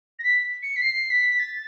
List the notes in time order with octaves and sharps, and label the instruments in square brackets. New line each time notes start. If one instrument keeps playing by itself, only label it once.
[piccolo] A#6
B6
C#7
B6
C7
B6
A6